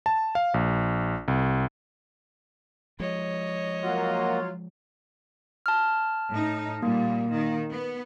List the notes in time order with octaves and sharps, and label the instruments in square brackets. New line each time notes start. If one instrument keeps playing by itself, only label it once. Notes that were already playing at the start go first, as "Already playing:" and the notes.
[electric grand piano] A5
F5
A#1
C2
[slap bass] F3 G#3 [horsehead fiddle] C#5 D#5
[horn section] F#3 F4 [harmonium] A#3 F#4
[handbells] A5 F6
[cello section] A2 D#4
[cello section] A#2 G3 [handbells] A#3
[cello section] D#3
B3